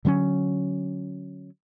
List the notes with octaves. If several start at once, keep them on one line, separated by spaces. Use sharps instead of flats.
D3 F#3 C4 C#4